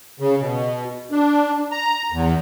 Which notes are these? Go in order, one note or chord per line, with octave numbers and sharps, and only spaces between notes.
C#3
B2
D4
A#5
E2